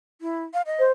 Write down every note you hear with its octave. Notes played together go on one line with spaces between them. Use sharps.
E4
F5
D#5
C5